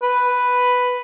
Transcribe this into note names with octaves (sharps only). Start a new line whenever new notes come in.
B4